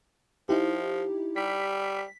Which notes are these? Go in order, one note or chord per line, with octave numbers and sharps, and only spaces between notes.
F3 D#4 E4 G4
G3 B6